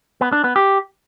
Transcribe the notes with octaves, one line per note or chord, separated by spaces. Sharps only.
B3
D4
B3
G4